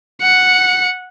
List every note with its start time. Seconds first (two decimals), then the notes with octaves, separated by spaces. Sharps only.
0.22 F#5 C#7